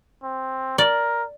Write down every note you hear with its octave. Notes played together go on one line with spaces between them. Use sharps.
C4
A#4 D5